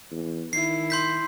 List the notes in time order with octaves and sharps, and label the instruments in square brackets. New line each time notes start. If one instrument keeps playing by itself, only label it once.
[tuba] E2
[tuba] D#3 [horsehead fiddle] E4 [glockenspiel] C7
[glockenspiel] C6 G6 B6